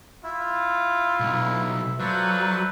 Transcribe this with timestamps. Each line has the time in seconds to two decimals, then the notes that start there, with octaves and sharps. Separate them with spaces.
0.24 E4 F4 E5
1.20 B1
2.00 F#3 F4 A4 B4 C5 D5 E5